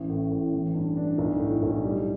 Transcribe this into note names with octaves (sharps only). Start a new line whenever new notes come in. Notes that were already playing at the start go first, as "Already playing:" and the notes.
Already playing: A1
A2
A2
E3
G2
D4
B1
A2
B1
G3